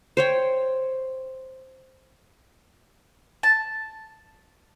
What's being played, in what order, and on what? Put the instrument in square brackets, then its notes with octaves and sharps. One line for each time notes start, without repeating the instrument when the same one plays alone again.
[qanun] C5 C#5 G5
[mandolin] A5